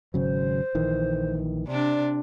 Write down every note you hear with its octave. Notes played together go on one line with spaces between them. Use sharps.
G#1 C#3 F#3 C5
A#1 D#3 E3
C3 D4 D5